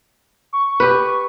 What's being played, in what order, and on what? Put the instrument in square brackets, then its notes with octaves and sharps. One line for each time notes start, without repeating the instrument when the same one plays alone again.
[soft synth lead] C#6
[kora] G4 B4